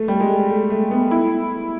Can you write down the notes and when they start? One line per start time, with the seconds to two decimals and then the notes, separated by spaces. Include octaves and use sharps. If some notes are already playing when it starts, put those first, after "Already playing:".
Already playing: A3
0.08 G3
0.20 G#3
0.50 A3
0.70 A3
0.91 B3
1.11 E4